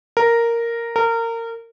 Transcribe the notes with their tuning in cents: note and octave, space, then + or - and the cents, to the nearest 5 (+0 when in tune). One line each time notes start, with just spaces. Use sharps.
A#4 -5
A#4 -25